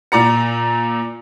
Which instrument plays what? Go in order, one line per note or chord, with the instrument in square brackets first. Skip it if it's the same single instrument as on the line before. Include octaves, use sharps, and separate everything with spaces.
[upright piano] A#2 D5 A#5 C#7